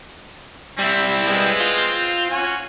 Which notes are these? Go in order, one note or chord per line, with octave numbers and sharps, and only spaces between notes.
G3 C4 E4
G#3 B3
F4
C#4 F#4 G#5